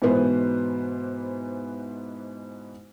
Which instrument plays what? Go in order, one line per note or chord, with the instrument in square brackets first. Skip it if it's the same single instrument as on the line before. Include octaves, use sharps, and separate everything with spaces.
[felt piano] G#2 B2 E3 B3 B4 C5